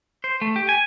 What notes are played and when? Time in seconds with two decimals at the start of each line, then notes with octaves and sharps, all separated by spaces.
0.24 C5
0.41 A3
0.56 G4
0.69 G#5